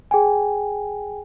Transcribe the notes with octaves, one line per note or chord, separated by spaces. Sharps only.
G#4 G5 G#5